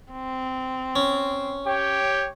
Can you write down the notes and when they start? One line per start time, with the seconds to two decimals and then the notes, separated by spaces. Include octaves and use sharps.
0.12 C4
0.96 C#4
1.67 G4 C#5 G5